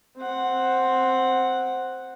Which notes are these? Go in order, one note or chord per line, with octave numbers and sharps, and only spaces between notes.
C4 F#5